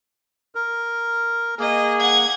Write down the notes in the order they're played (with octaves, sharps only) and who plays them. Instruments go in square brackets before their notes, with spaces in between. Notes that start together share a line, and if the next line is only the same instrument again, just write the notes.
[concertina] A#4
[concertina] A#3 [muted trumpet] G#4 [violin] D#5
[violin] F#5 G#6